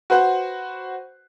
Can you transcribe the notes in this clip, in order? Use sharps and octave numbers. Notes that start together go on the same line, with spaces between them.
F#4 B4 C5 F#5